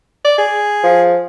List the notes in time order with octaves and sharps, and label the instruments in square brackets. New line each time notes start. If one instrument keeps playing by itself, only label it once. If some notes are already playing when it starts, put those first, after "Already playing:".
[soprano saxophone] D5
G#4
[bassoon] F3